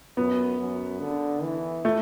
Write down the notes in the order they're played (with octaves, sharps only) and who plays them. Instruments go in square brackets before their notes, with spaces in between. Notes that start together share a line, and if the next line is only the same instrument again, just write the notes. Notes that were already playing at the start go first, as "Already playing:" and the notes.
[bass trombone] F#2 [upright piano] B3
[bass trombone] F#2
D3
E3
[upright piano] A3